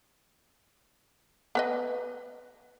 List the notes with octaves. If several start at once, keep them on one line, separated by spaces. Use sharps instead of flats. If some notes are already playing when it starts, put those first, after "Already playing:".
B3 B4 D#5